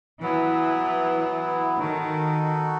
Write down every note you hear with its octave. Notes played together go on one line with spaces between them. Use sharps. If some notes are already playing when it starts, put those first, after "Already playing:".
E3 F#3 B3 E4
D#3 D#4 F#4 A4